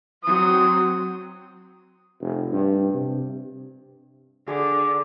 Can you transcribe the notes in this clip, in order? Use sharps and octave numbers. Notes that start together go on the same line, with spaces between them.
F#3 C4 D#6
F1
G2
C3
D3 G#4 D5 D6